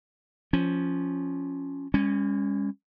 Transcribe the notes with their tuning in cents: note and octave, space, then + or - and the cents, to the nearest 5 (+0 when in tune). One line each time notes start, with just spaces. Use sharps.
F3 +0 C#4 +0
G#3 -45 C#4 +0